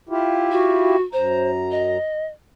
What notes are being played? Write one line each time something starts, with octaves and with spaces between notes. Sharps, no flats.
E4 F4 G4
F#4
F#2 C5 A#5
D#5